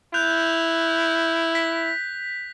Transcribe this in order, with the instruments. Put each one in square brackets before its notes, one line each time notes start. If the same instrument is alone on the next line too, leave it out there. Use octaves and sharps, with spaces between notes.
[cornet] E4 [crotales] F#6 G6 F7
[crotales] B6